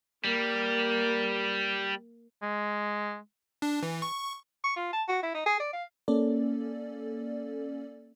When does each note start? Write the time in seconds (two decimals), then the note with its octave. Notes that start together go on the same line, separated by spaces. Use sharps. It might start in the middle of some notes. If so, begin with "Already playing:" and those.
0.24 G3 A#3
2.42 G#3
3.62 D4
3.83 E3
4.02 C#6
4.64 C#6
4.76 F4
4.93 A5
5.08 F#4
5.23 E4
5.34 D#4
5.46 G#4
5.60 D5
5.73 F5
6.08 A#3 C#4 A4 D5